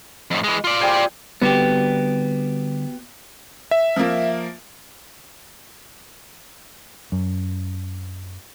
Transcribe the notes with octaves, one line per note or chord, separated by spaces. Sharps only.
F2 A2
E3 G#3
F4 D5
G3 G#4 C5
D3 G3 B3 C4 F#4 G4
E5
F3 A#3
F#2